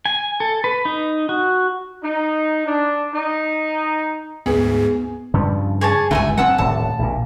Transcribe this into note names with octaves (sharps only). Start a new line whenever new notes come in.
G#5
A4
B4
D#4
F#4
D#4
D4
D#4
D2 G#2 B3 G#4
G2 C#3 F3
G#4 C#5 A5
G1 C#2 F#2 A3 E5 G#5
F#3 C4 F#5 A5 E6
D#1 A2 C3 A5
A#1 A#2